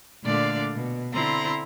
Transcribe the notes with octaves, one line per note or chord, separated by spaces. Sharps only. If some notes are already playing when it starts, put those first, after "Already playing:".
A#2 D3 A3 D4 D5 F5
B2
D3 C4 E4 A#5 C6